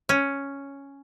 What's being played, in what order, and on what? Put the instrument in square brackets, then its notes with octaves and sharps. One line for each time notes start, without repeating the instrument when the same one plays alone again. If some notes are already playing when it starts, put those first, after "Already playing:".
[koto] C#4